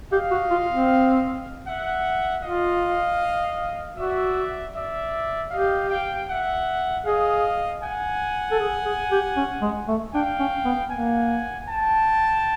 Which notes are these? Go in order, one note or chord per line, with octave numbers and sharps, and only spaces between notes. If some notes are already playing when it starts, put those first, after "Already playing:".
G4 D#5 F5
F#4
F4
C4
E5 F#5
F4 D#5 F5
F#4 D5 E5
D5 E5
G4 D#5 F5
F5 G5
E5 F#5
G#4 D#5 F5
F#5 G#5
A4
G#4
G#4
G4
C#4
G#3
A3
D4 F5 G5
C#4
B3
A#3 F#5 G#5
G5 A5